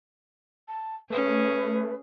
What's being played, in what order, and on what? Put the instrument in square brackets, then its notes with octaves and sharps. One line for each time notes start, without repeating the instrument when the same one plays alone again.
[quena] A5
[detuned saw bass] A3 [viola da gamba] C#4 G#4 [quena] B4